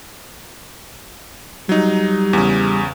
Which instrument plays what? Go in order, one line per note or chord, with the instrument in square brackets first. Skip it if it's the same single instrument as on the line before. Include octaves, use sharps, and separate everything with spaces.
[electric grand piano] F#3 D#4 [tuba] G3
[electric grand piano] E2 C#3